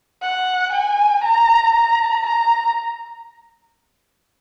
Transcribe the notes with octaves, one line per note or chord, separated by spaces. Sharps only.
F#5
G#5
A#5
A#5
A#5